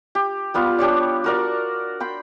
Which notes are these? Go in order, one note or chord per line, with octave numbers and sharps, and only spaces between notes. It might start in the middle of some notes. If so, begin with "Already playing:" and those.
G4
G3 B3 F4
D4 G4 C#5 D5
F#4 A#4 D5
G5 B5 C6